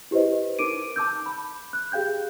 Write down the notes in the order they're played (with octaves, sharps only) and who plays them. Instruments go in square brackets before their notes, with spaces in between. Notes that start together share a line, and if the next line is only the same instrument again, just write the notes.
[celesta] E4 G4 B4 C5 D#5
D#4 A#4 D6 D7 D#7
A5 D6 E6 G6
B5
F#6
G4 G#4 F5 G5 G6